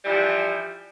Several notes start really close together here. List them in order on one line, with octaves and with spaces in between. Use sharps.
G3 E3 F3